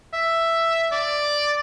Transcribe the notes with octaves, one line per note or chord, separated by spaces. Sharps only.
E5
D5